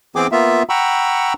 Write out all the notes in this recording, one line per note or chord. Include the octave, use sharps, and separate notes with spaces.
E3 B3 C4 G#4 G5 D6
A#3 B3 F4 E5
F#5 G5 A#5 B5 C#6 E6